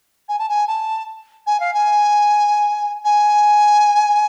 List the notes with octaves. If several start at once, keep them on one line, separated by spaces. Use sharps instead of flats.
G#5
A5
G#5
A5
G#5
F5
G#5
G#5